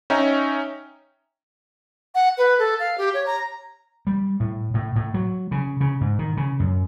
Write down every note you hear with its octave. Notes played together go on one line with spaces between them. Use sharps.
C#4 D#4 E5 G5 A#5
F#5
B4
A4
F5
G4
C#5
A#5
G3
A2
A2
A2
F#3
C#3
C#3
G#2
D#3
C#3
F#2